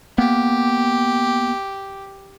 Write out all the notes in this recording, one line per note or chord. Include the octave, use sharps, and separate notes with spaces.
A#3 B3 G4